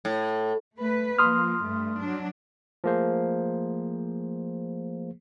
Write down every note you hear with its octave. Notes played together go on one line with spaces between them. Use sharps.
A2
A3 B4
F3 A#3 C6 D#6 F6
G2 A3
F#3 D4
F3 A3 A#3 G#4 C5